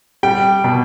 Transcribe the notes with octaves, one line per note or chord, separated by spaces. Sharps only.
G3 G5
B2